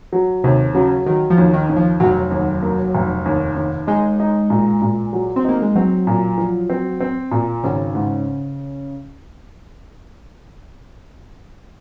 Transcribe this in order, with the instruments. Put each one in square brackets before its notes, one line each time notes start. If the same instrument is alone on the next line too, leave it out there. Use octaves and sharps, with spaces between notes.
[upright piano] F#3
[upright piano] D#2 [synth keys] C3
[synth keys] C#3 [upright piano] F#3
[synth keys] D#3 [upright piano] F#3
[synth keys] F3
[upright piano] D#2
[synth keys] D#3
[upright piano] D#2
[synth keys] F3
[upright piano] F1 [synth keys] F#3
[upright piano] D#2
A#3
F1
D#2
D#2
[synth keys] G#3 [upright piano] D#4
[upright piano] D#4
A#2
A#2
F#3
[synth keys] C4
[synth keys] A#3 [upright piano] D#4
[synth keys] G#3
[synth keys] F#3 [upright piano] C4
[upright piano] A#2
F3
C4
C4
A#2
[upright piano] G#1 [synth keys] C#3
[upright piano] G#2